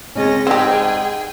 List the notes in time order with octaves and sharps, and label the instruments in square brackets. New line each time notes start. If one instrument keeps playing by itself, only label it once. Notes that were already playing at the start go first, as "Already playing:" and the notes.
[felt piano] C#3 G#3 C4 [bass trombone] C#4 [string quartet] D#5 A#6
[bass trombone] G#2 [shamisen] C4 G4 [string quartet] G#4 G5 [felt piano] D5 C6